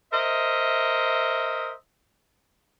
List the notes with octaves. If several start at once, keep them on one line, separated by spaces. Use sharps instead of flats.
A#4 C5 D#5 E5